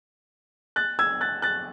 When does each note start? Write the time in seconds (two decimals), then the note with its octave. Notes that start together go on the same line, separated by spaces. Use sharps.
0.76 F#6 A6
0.99 E6 G#6
1.21 F#6 A6
1.42 F#6 A6